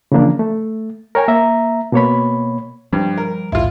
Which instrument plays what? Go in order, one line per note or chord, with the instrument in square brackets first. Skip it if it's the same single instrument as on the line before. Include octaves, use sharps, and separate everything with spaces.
[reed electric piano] C#3 E3 F3 A#3 D4
A3
A#4 C#5 G5 G#5
A#3 E5 A#5
B2 A#3 C#5 B5
[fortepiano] G2 [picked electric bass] F3 G3
[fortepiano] A#4
[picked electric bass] A#1 D#2 G#2 [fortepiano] E4 F4